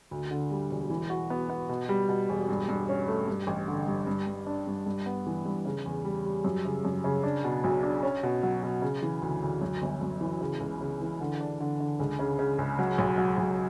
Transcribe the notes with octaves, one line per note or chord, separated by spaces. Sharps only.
D2
D3
G3
E1
E3
F#4
B3
B3
B2
G3
B2
E1
G2
G2
C#4
A3
G2
A1
D3
G2
G2
G2
D4
G2
G2
B3
E3
G2
C#3
E2
G3
G3
F#2
C#3
F#2
C#3
D4
B2
B1
D4
C#4
B2
F#3
B2
C#3
E3
D2
D2
F#2
G1
F#2
E3
C#3
C#2
C#3
E3
D3
D4
D3
D3
C#2
C#3
C#3
C#2
F#3
B1
F#3
B1